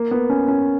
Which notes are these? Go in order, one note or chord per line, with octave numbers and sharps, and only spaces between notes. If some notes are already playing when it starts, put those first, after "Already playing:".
Already playing: A#3
B3
C#4
C#4